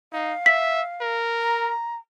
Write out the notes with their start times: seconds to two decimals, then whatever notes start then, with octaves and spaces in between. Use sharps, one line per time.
0.13 D#4 F5
0.46 E5 B6
1.01 A#4
1.41 A#5